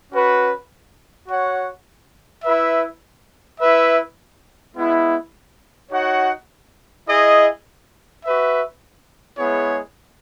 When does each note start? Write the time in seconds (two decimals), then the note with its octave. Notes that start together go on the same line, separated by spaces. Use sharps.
0.12 C#4 F#4 B4
1.27 F#4 C#5 F#5
2.43 E4 B4 E5
3.59 E4 B4 E5
4.75 G#3 B3 E4
5.91 D#4 F#4 C#5 F#5
7.07 E4 G#4 D#5
8.24 F#4 B4 E5
9.38 G#3 B3 E4 G#4 C#5